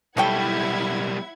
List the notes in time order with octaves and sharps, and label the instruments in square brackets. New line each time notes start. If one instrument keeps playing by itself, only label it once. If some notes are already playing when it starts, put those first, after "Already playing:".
[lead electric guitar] B1 G3 [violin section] E4 F#5 G#6 [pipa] A4 C#5 G5